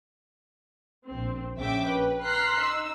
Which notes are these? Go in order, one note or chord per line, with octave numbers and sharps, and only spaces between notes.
A#1 C4
A#1 C#3 E5 G5 D6
B4
A#5 C6 F6 F#6 B6 C7
D#4 E6